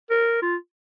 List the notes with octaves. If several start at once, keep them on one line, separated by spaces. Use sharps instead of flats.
A#4
F4